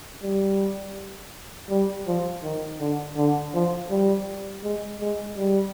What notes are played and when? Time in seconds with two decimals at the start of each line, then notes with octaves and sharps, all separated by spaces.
0.23 G3
1.70 G3
2.07 F3
2.43 D#3
2.80 D3
3.16 D3
3.54 F3
3.91 G3
4.63 G#3
5.01 G#3
5.37 G3